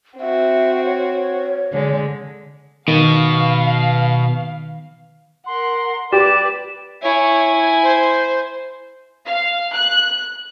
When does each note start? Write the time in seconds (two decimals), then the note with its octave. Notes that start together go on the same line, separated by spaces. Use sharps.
0.20 C4 F#4 E5
0.85 C#5
1.72 D3 G#3
2.88 B2 D#3 F5
5.46 A#4 F#5 C6
6.13 G4 B4 D5 E7
7.03 E4 C#5 G#5
7.83 C5
9.27 F5
9.75 F#6